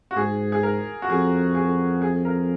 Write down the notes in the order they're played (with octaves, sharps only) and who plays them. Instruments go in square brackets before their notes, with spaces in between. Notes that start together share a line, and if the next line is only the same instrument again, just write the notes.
[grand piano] F#4
[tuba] G#2 [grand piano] G#4
[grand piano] G#4
A#4
F#4
[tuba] F2 [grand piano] G#4
[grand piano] G#4
G#4
A#4